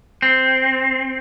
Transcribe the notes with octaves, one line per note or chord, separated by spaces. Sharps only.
C4